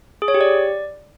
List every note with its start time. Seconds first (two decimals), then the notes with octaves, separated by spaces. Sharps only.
0.22 G#4
0.28 C#5
0.34 G4
0.41 D5